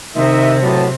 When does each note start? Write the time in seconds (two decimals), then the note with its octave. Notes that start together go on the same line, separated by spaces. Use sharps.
0.16 C3 D#3 D#4 D#5 E5
0.62 A2 F#3 B3 A5